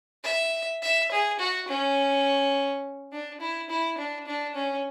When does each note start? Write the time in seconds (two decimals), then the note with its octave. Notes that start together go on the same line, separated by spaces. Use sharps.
0.24 E5
0.82 E5
1.11 G#4
1.39 F#4
1.68 C#4
3.12 D4
3.41 E4
3.70 E4
3.98 D4
4.27 D4
4.55 C#4